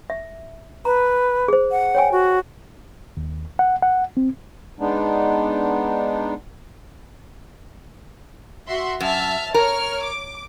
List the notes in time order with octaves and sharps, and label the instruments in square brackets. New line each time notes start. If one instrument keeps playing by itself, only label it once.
[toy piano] E5
[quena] B4 [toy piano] A#5
[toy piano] G#4 C5
[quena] F#5
[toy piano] C#5 G5 G#5
[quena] F#4
[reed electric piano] D#2
F#5
F#5
C4
[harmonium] G#3 B3 D4 D#4
[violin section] F#4 E5 C6
[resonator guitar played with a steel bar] F#2 [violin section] E5 A5 F6
[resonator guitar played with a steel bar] A#4 [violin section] C#5 F6
[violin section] D6